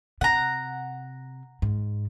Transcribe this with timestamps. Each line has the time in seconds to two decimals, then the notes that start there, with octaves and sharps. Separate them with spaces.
0.21 C3 F#5 A#5
1.62 G#2